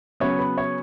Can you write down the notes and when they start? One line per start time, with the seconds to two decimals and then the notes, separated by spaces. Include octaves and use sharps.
0.20 C#3 F#3 B3 C#5
0.39 B4
0.58 C#5